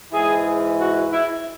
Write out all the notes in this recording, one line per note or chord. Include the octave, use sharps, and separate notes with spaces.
G#2 E3 G#4
F#4
E4